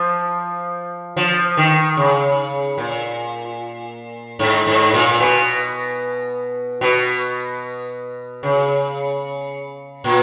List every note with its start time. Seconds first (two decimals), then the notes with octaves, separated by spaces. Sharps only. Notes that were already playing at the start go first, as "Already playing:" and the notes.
Already playing: F3
1.17 F3
1.57 D#3
1.97 C#3
2.78 A#2
4.39 G#2
4.67 G#2
4.94 A#2
5.20 B2
6.81 B2
8.43 C#3
10.04 A#2